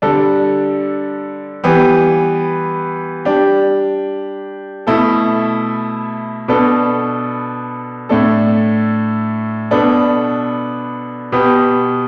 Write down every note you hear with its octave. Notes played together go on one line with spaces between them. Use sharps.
D3 G3 D4 A4
E3 G3 B3 G4
G3 D4 G4
B2 A3 E4 A4
B2 B3 D4 A4
A2 A3 D4 A4
B2 B3 D4 A4
B2 B3 G4